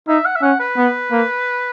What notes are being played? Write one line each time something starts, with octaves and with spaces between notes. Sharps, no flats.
D#4 E5
F#5
E5
C#4 F#5
B4
B3
A#3